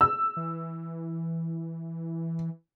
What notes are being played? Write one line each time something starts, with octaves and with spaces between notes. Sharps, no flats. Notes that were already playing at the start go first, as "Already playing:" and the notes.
E6
E3